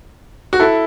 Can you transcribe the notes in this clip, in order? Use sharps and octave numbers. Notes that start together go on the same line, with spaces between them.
F#4
E4 A4